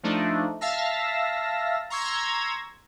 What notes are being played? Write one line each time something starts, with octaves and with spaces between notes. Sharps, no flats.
F3 A3 D4 D#4
E5 F5 A5 E6 A#6
A#5 C6 C#6 E6 G#6 A#6